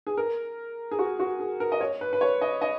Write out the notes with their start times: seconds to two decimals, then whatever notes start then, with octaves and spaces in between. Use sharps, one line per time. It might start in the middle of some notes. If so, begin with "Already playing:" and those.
0.07 G#4
0.17 A#4
0.91 G#4
0.99 F#4
1.20 F#4
1.40 G#4
1.60 A#4
1.72 D#5
1.81 C#5
2.01 B4
2.13 B4
2.21 C#5
2.41 D#5
2.62 D#5